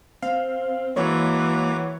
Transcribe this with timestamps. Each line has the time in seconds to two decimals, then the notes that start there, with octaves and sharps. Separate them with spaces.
0.22 C4 F5
0.97 E3 F#3 G#3 A#3 F#4 C#5 D6